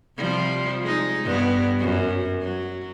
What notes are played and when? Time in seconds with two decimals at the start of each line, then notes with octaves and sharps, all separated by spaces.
0.17 C3 F3 G3
0.84 G#3 D#4
1.24 G2 B3
1.79 F#2
2.41 F#3